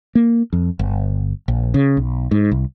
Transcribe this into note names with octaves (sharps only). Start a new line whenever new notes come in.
A#3
F2
G1
A#1
C#3
B1
G#2
C2